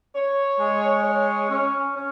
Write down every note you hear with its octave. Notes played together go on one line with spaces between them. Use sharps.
C#5
G#3
C#5
C#4
C#4